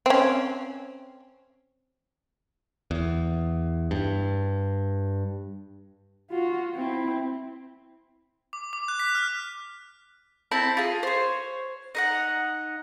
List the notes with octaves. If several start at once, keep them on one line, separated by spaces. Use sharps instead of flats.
C4 C#4
E2
G2
F4 F#4
C4 E4
D6
D6
F#6
B6
F6
C4 E4 A5 B5
F4 G#4
C5 C#5
D#4 D#5 F#5